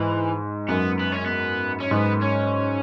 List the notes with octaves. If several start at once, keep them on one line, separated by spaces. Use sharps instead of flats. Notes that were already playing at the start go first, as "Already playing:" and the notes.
Already playing: G#2 E3
F#2 B3
B3
C#4
B3
C#4
G#2 B3
C#4